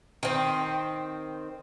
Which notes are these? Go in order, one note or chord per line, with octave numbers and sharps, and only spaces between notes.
D#3 C4